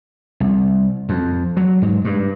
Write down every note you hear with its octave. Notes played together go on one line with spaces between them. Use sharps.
C2
F2
F#3
G#2
G2